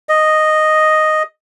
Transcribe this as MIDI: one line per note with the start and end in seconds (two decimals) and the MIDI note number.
0.09 1.23 75